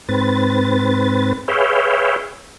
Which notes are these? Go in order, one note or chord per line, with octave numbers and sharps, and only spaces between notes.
G#2 C4 B4 A6
G#4 B4 C#5 E5 F5 G5